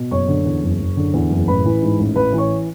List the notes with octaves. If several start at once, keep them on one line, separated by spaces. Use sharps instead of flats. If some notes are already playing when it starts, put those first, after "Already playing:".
Already playing: B2
F#1 C#5 C#6
D3
E2
F#1
F#1
D3
E2
F#1
A1 B4 B5
E3
G#2
A1
A1 B4 B5
E3
C#5 C#6